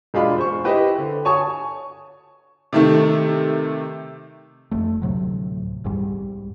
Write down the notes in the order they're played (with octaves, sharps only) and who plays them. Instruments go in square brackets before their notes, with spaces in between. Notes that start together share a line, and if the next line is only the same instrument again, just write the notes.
[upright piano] E1 G#3 D4 F4 B5
C5 C#6
E4 G4 B4 C5 D#5
D3
C#5 G#5 A5 C#6 D#6
[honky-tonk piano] C3 D#3 A3
[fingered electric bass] F1 A3
D2 A2 C3 F#3
C2 G#2 G3